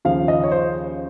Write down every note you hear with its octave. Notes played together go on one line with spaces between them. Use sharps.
D#2 C#3 F3 F5
D#5
C#5
C5